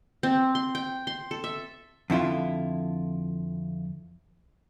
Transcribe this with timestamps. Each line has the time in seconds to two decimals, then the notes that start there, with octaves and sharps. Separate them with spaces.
0.23 C4
0.55 C6
0.75 G5
1.07 C6
1.31 A4
1.44 E5
2.10 F2 D3 E4 F4